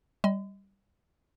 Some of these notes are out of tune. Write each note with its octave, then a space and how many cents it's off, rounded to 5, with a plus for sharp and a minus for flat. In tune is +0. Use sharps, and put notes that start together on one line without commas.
G3 +0 D#5 +25 C6 -40